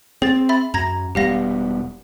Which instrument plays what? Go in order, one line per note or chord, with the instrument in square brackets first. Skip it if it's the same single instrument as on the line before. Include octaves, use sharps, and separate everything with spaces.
[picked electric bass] C4 [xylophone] G#4 A6
[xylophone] E5 B5 A6
[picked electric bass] F#2 [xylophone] A#5 G#6 A#6
[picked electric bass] E1 G3 B3 [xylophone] G4 F5 A#6